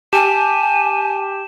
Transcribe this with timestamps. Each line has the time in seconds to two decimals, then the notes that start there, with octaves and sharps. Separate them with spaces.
0.13 G4 G#5 A5 E7